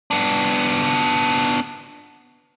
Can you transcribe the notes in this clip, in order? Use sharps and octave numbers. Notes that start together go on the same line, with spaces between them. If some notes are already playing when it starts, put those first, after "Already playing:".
B3 D4